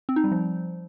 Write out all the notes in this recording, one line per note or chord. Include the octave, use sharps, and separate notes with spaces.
C4
D#4
G3
F3